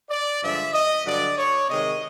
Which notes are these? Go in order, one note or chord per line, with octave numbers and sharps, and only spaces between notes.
D5
G2 D3 F3 G#3 E5
D#5
G2 D3 F#3 D5
C#5
C3 D#3 G#3 D#5